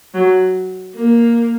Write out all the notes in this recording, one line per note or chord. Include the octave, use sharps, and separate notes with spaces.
F#3
A#3